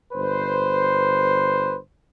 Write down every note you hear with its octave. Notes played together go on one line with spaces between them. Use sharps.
G1 B4 C5